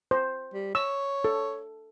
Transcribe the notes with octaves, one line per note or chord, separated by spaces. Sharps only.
C5
G3
C#5 E6
A4